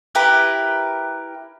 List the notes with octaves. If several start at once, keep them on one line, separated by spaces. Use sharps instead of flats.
E4 G4 A#4 B4